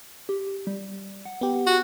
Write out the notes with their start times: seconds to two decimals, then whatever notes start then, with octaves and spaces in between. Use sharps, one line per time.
0.29 G4
0.67 G3
1.25 F#5
1.41 B3 G4
1.67 F#4